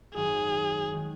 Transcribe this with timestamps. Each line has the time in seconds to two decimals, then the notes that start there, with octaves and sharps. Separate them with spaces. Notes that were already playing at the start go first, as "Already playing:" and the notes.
0.14 G#1 F#2 D#3 G#4
0.93 D#3 G#3